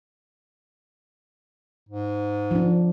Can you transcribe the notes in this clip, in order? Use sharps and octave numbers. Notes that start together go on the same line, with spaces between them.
G#2
F3 D4